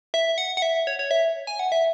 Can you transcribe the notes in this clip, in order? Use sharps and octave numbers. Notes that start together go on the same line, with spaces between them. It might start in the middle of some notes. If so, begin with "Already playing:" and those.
E5
F#5
F#5
E5
C#5
C#5
E5
G#5
F#5
E5